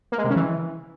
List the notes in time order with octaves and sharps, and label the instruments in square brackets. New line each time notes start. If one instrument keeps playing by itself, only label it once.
[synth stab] A#3
G#3
C3
C#3
E3